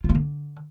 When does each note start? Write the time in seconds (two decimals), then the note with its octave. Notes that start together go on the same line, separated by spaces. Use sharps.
0.04 F4
0.10 A#3
0.15 D3